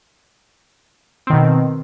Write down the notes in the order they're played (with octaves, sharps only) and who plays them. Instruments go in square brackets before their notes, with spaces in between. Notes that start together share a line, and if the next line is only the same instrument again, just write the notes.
[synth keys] C4
D#3
B2